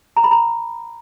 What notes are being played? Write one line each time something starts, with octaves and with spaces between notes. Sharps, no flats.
A#5
B5
A#5